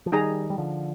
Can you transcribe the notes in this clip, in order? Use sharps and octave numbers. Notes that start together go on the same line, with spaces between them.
F3
D#3 G3 D#4 G#4 D#5 A#5
G3
D3 F3